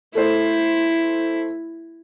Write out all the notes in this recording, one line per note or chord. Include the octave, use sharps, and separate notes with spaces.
A3 E4 A4 C5